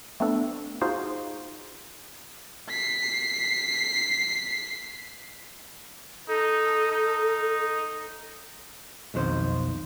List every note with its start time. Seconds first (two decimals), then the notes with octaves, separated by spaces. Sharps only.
0.20 A3 B3 C4 D4 A4
0.81 D#4 F4 F#4 G#4 C5 F5
2.69 B6 C7
6.28 D#4 A4
6.91 D#4
9.14 B1 F2 D#3 C5